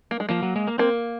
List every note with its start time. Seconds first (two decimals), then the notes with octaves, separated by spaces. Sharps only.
0.11 A#3
0.20 G#3
0.29 F3 A#3
0.43 F#3
0.56 G#3
0.68 A#3
0.78 A#3 C4